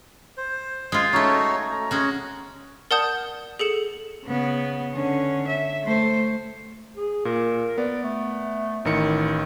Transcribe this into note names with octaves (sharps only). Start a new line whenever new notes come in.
C5
G#3 F4
A3 C#4 D#4 F#4 C#5
A#5
G#3 C#4 F#4
A#4 D5 F#5 A5 D#6 G6
G#4 A4 C#7 E7
C#3 B3
D3 C#4
E5
A3 C5
G#4
A#2 A#4
B3 D5
A3
A1 D#3 E4 C#7